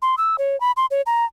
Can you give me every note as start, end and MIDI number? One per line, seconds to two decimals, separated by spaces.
0.02 0.15 84
0.18 0.36 88
0.38 0.59 73
0.61 0.72 83
0.77 0.86 84
0.91 1.02 73
1.06 1.25 82